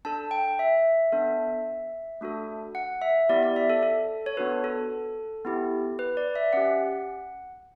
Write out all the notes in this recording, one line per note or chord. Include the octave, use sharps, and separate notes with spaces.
D4 A4 A5
G5
E5
B3 D4 A4
A3 D4 F#4 A4
F#5
E5
B3 E4 G4 D5
D5
E5
A4
A4
C#5
B3 D4 F#4 A4 B4
A4
B3 E4 G4
B4
D5
E5
C#4 G4 F#5